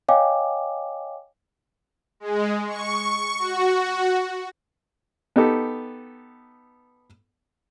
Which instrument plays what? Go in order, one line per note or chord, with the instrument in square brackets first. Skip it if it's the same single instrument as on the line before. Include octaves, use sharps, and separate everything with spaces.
[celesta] C#5 D#5 F5 G5 G#5 D6
[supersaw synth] G#3
C#6
F#4
[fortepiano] B3 D#4 G4 A4